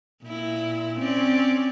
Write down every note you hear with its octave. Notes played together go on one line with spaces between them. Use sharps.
A#2 E4
C4 C#4 D5